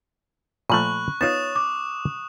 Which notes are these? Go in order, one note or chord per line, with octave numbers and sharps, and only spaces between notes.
A#2 F3 A3 B5 C#6 F#6 F#7
B3 D#4 F4 C#5 D#6 A6 E7
D6